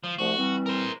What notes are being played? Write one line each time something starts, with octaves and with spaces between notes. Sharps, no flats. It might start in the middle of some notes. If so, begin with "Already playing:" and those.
F3
C2 F3 A3 F#4
E3 G3 C4
A#4 C5